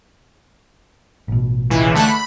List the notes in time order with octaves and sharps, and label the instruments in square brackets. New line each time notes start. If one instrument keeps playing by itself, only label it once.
[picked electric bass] A1 B2
[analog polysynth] C#2 E3
D3 A3 F#6
B5